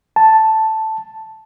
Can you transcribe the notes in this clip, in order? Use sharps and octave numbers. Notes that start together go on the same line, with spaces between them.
A5